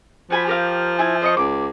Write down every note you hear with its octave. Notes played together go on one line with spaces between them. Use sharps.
F3 F#4 G#5 B5
G4 A#4 F5
E4 G#5
C5 D#5 C#6
C#2 D6